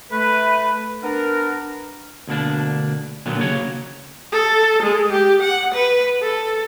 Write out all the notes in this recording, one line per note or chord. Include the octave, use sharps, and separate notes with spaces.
A3 B4
B3 D4 A#4
D2 B2 A#3 D4
A#2 D3 D#3 F#3 A#3 B3
C#3 A#3 F#4 C#5
A4
G#3
G4
F#5
B4
A4